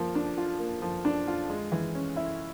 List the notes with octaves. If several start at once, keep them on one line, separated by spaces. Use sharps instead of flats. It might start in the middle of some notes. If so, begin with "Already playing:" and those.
Already playing: F3 A#3
D4
F4
A#3
F3
D4
F4
G#3
E3
C#4
E4